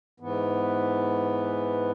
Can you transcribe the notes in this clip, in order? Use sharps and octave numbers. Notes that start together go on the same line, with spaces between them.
G#2 E3 B3